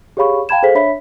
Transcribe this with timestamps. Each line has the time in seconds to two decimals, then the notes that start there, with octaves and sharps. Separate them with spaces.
0.17 G4 G#4 C#5 F5 B5 C#6
0.49 F5 G5 A5 B5 G#6 E7
0.63 G#4 A4 C5 F5 B6
0.75 D4 C#5 E5 B5 B6